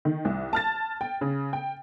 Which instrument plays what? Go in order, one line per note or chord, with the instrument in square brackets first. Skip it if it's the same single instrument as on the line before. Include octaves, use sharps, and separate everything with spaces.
[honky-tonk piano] D#3
C2
A5 F6 A6
G5
C#3
G5